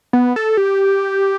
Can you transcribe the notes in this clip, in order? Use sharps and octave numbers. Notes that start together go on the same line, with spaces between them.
B3
A4
G4